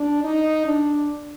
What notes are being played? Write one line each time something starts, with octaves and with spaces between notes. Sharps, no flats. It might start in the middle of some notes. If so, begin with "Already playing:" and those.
Already playing: D4
D#4
D4